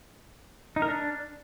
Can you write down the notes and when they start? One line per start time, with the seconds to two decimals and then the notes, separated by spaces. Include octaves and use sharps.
0.76 D#4
0.82 A#4
0.88 D4